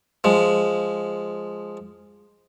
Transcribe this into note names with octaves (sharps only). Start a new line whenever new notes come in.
F3 G#3